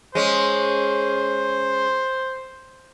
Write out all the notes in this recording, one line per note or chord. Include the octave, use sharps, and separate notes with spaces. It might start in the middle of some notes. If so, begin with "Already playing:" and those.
G#3 C#4 C5